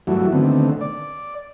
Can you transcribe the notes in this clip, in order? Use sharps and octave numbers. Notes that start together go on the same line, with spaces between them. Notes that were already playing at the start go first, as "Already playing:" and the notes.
G2 E3 F#3 A3 E4 F#4
D3 D#3 A3 B3 C4
D5